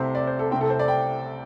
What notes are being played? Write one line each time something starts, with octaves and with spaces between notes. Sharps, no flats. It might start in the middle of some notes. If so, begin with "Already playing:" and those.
Already playing: C2 C3 A3 C4 C5
D5
C5
A4
C2 C3 A3 C4 G5
A4
C5
D5
G5